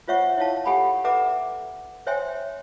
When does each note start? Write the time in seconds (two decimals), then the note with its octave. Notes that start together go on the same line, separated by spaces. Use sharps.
0.08 F4 C5 C#5 E5 F#5 C#6
0.38 E4 C#5 F5 A5
0.65 G4 A4 F#5 G#5 B5
1.04 A4 B4 E5 F#5 A#5 D6
2.07 C5 C#5 E5 G5 G#5 C6